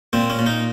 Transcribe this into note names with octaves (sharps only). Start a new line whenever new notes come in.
A#2 C4
C#4
A#2
D#4